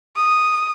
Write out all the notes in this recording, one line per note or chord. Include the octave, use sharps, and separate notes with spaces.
D#6